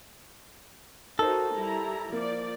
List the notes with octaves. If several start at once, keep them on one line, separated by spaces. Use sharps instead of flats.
D#4 F#4 A4 A#4 C5
G3 E4 A#5
F3 A#3 D5